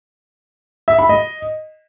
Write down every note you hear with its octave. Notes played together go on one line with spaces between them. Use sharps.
E5
B5
D#5